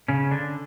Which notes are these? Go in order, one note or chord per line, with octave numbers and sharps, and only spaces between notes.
C#3 C#4
D3 D4